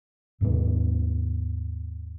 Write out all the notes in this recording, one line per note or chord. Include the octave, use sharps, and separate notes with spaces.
D#2 G#2 C3 B3